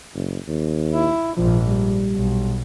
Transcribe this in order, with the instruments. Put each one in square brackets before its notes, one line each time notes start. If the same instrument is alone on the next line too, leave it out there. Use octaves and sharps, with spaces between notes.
[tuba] F#1
D#2
[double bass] E4
[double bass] A#1 G#2 [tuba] F3
[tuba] G3
[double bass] B1